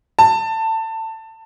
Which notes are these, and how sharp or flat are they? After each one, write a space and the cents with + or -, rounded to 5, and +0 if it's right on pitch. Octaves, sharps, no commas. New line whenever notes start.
A5 +20